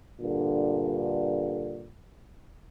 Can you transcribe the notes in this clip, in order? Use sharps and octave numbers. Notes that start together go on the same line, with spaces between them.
G2 A#2 D3